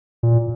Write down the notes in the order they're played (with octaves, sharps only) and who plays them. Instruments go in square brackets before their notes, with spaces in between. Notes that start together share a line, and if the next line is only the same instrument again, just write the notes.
[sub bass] A#2